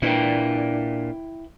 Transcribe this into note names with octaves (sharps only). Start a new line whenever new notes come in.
A#2 D4 E4 B4 G5